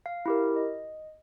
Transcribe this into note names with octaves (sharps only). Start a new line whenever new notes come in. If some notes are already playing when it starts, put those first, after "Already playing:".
F5
E4 G4 A#4
D#5